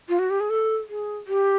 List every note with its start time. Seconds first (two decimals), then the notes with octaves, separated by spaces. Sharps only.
0.09 F4
0.19 F#4
0.30 G4
0.40 G#4
0.50 A4
0.89 G#4
1.27 G4